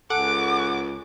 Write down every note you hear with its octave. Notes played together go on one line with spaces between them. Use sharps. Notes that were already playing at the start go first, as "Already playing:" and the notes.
C#2 A4 F#5 G#5 A5 D6